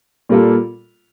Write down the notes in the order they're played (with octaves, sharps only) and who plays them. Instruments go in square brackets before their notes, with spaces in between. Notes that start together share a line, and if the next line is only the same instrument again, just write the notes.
[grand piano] A#2 G3 A#3 F4 A4